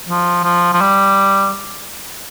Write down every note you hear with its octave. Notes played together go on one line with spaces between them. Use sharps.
F3
F3
F3
G3